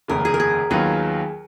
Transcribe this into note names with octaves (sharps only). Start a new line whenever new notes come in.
F1 D#2 C#3 A#4
G#4
A#4
G#4
D#2 D#3 F#3 B3 F4 G#4